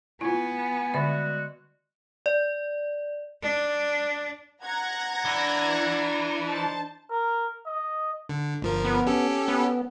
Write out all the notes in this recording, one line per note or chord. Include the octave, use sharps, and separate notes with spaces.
B3 E4 F4 G#5
D3 G3 G#3 F#4 E5
D5
D4
F#5 A#5 G#6 A#6
E3 D4
D#4 C5 A5
A#4
D#5
D3
G1 F3 A#4
B3
C#4 G4 A4
B3